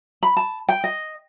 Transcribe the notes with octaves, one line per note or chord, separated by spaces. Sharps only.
B5
A5
G5
D#5